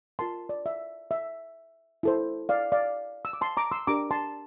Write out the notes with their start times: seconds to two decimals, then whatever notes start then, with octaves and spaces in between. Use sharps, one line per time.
0.19 F4 A#4 A5 C6
0.49 D5
0.66 E5
1.11 E5
2.03 E4 A4 C5
2.49 D5 F5
2.72 D5 F5
3.25 E6
3.33 D6
3.41 A5 C6
3.57 A#5 D6
3.71 C6 E6
3.87 D4 G4 A#4 A#5 D6
4.11 A5 C6